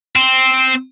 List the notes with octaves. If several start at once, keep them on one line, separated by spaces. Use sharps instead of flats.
C4